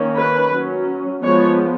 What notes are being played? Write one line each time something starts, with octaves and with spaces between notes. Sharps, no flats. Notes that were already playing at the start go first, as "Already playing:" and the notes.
Already playing: D#3 A#3 C#4
B4
F#3 C#4
F3 G#3 B3 C#5